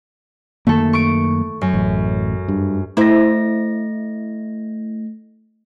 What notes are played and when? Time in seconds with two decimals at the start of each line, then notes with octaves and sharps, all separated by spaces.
0.67 F#2 D#3 A3 A#3 A4
0.93 C#6 D7
1.61 F#2
1.74 A1
2.48 G2
2.97 A3 E4 C5 A#6